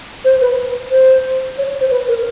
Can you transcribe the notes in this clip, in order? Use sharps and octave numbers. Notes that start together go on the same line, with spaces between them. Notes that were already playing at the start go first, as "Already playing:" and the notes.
C5
B4
C5
C#5
C#5
C5
B4
A#4